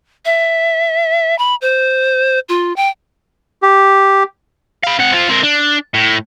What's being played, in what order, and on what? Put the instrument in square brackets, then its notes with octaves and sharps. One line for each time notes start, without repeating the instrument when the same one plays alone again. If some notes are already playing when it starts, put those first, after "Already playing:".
[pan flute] E5
B5
C5
F4
G5
[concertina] G4
[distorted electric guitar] F5 B5
C3 F#5
C4 F4
C4 A#4
D4
A2